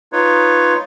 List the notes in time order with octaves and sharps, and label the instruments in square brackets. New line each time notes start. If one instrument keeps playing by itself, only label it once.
[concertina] D#4 F4 B4 C#5